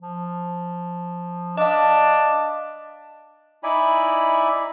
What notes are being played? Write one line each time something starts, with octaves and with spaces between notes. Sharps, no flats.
F3
D4 D#5 F5 A5
D#4 E4 D5 G#5 B5